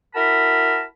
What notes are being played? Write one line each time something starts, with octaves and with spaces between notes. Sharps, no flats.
E4 F#4 A#4 A5 B5